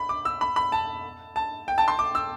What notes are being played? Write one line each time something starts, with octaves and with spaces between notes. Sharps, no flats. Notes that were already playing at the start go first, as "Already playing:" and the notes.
Already playing: B5
D6
E6
B5
B5
A5
A5
G5
A5
C6
D6
E6